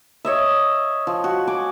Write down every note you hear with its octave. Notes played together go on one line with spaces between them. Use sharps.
C#5 D#5 E5
F3
F#4
G#5 D6